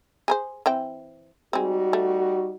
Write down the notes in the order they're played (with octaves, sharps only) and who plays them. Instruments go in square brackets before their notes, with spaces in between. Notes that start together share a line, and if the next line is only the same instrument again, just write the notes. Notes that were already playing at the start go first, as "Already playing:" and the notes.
[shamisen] G#4 A#4 C5
E3 C4 G5
[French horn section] G3 D#4 F#4 [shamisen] G#3 C4
[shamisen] A3